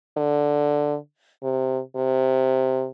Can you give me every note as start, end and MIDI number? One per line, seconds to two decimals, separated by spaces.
0.17 0.97 50
1.43 1.80 48
1.96 2.87 48